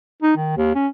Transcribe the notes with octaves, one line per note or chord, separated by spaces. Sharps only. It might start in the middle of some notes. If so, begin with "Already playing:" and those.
D#4
D#3
D#2
C#4